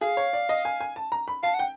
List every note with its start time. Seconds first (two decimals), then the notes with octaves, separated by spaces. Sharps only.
0.01 G#4 F5
0.17 C#5
0.33 D5
0.49 D#5
0.65 G#5
0.80 G#5
0.96 A5
1.12 A#5
1.28 B5
1.43 F5 A5
1.54 F#5 G5